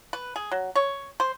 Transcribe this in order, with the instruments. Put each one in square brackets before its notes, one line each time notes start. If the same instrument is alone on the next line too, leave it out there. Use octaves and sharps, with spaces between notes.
[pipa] B4
G#4
F#3
C#5
C5